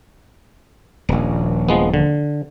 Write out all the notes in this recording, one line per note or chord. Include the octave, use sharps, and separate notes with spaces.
D#1 A#1
F3 G#3 B3
D3